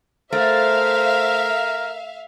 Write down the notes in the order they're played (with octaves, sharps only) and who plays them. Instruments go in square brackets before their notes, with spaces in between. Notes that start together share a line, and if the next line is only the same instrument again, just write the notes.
[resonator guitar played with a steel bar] A3 [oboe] A#4 [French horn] C5 [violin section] E5 F5